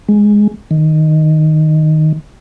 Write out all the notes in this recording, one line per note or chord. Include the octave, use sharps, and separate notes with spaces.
G#3
D#3